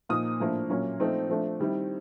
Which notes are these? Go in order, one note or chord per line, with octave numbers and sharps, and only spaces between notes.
A#2 F3 A#3 D#4 D#6
A2 F3 A#3 D4
A#2 F#3 A#3 C#4
F3 A3 C4 D#4
F3 A3 D4
D#3 G3 C4 E4